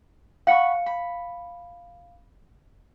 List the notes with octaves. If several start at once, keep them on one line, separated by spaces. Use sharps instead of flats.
F5 F#5 B5 C#6 C#7
B5